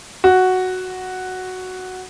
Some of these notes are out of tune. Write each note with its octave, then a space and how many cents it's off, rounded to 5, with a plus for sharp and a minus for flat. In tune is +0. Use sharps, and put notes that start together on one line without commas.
F#4 +0